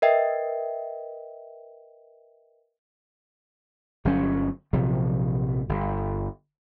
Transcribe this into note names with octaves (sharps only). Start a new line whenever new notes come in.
A#4 B4 D#5 E5 G5
G1 F#3 C#4
A#1 C3 F3 F#3
G1